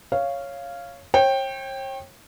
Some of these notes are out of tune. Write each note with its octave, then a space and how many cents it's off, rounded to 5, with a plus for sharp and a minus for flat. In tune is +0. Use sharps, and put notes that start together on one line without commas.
C#5 +0 F5 -10
C#5 -40 G5 +0